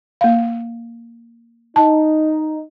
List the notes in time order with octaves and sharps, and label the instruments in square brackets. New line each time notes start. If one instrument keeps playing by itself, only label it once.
[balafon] A#3 F5
[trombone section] D#4 [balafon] A5